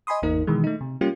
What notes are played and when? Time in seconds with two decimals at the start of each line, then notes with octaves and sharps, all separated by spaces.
0.07 D#5 G#5 B5 C6 D#6
0.22 G#1 E2 A#3 D#4 A#4
0.47 B2 D#3 E3 G#3
0.64 A3 D#4
0.81 C3
1.01 G3 A#3 C#4 F4 G4